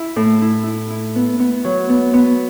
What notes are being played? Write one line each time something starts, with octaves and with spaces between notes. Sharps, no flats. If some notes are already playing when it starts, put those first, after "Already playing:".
Already playing: E4
A2
E4
E4
E4
B3
B3
F#3
B3
B3